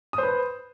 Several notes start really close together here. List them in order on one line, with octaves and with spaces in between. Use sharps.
D#6 C5 B4